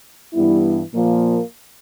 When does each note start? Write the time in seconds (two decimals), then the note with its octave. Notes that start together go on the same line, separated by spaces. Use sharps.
0.33 G2 E3 G3 B3 E4
0.92 A#2 F3 A#3